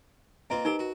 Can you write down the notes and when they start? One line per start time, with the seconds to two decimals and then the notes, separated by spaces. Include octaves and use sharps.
0.50 A#3 C4 F4 B4 D#5 A#5
0.65 D#4 G4 A#4 C5
0.79 F#4